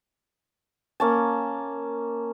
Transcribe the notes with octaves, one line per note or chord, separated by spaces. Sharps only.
A#3 C#4 A5